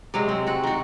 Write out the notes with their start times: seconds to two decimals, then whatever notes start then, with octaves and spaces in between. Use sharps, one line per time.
0.14 C3 F#3 G#3
0.29 C4
0.47 F#4 F#5
0.64 D#3 F#4